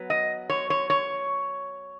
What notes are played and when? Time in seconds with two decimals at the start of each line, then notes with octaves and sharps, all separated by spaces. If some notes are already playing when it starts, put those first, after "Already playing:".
Already playing: F#3 B3
0.10 D#5
0.49 C#5
0.70 C#5
0.90 C#5